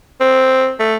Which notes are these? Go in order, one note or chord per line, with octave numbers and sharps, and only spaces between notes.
C4
A3